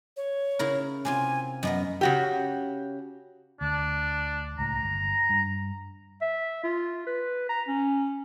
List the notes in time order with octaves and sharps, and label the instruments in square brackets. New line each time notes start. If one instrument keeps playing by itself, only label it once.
[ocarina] C#5
[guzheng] C#3 E4 A#4
[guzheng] C3 C4 F4 [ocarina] G#5
[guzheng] F#2 B3 A#4 [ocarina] D#5
[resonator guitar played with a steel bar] C#3 F#4 G4
[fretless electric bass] D2 [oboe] D4
[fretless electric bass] C#2 A2 [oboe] A#5
[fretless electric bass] G1
G2
[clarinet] E5
F4
B4
A#5
C#4